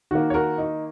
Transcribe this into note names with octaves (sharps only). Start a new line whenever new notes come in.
D#3 A#3 F#4
C#5
F#4 A#4
D#4